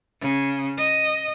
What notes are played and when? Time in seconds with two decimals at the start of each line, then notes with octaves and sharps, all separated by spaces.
0.21 C#3
0.79 D#5